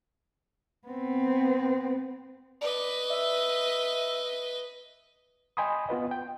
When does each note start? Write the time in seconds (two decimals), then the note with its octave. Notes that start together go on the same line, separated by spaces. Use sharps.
0.88 B3 C4
2.61 B4 D5 D#5
3.10 E5
5.57 D#5 G5 G#5 B5 C6 D#6
5.89 B3 F4 B4 D#5
6.11 G5